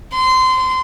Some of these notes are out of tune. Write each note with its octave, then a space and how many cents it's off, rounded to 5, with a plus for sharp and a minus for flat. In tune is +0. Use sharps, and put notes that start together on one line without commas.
C6 -20